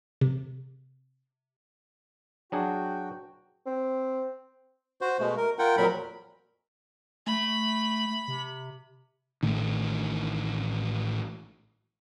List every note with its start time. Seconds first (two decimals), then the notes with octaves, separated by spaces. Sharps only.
0.21 C3
2.52 F#3 D4 F#4 G#4 G5
3.66 C4
5.01 F#4 C5
5.20 B2 G#3 A3
5.37 A#4
5.59 F4 A#4 F#5 G5
5.77 F2 A#2 F#3 A#4 B5
7.27 A3 B5
8.28 C3
9.43 A1 A2 D#3